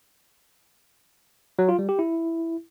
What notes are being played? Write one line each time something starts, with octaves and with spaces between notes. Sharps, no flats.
F#3
F4
G3
G4
E4